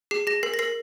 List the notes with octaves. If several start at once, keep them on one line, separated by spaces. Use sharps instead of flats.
G#4 C7
G#4 A#6
A#4 C7
A#6
A#4 C7